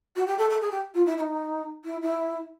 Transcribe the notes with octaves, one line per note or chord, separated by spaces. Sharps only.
F#4
G4
A4
A4
G#4
G4
F4
E4
E4
D#4
E4
E4